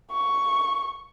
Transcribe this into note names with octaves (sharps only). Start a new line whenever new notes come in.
C#6